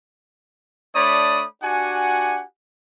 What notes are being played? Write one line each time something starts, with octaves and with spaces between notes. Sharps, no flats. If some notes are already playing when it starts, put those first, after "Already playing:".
A3 D4 C#5 D5 B5 D#6
D4 F#4 G4 F#5 G#5